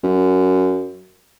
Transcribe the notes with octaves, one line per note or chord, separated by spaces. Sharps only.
F#2